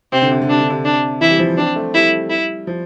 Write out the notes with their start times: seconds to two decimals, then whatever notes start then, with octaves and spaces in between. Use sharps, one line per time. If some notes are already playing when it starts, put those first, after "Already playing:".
0.12 C3 C4
0.22 D3
0.31 C3
0.42 D3
0.49 C3 D4
0.60 D3
0.70 C3
0.85 D4
1.21 E3 E4
1.30 G3
1.39 F3
1.57 C4 D4
1.76 A3
1.94 G3 E4
2.30 E4
2.67 F3